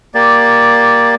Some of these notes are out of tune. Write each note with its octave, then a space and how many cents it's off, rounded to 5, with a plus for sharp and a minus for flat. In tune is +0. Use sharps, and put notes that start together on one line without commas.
A#3 +10 G4 +0 D5 +0